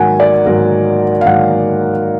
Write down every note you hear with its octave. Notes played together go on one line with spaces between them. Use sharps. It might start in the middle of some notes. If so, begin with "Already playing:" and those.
Already playing: G#2 D#3 F#3 A#3 F#5 G#5
D5
G#2 D#3 F#3 A#3 A#4
F5
G#2 D#3 F#3 A#3 F#5